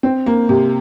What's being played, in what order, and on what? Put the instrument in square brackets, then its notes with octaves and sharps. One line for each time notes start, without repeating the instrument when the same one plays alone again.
[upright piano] C4
A#3
C3